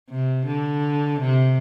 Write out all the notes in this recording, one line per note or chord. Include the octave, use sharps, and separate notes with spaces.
C3
D3
C3